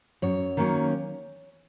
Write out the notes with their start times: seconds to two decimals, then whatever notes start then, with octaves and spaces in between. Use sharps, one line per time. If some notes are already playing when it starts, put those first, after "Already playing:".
0.22 F#2 C#5
0.57 D#3 F#3 A#3 C#4